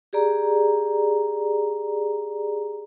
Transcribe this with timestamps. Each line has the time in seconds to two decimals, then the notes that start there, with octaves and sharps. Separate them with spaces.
0.13 G4 G#4 D5 A#5